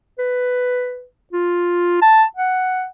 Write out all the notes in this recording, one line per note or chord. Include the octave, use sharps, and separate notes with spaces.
B4
F4
A5
F#5